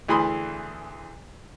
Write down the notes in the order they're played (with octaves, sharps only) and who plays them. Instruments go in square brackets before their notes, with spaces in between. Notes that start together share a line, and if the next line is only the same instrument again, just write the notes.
[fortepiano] D2 E3 G#4 B5 C6 D#6